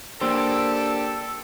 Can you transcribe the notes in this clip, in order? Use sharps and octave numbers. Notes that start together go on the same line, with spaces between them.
A#3 D4 G4 A4 C5 E6